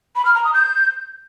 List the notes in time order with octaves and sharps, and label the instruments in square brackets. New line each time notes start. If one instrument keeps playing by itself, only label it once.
[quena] B5
F6
A#5
D#6
G6